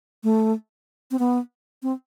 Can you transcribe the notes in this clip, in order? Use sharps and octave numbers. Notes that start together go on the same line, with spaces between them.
A3
C4
B3
C4